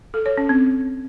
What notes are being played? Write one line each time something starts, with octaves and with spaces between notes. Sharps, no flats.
A4
C#5
C#4
C4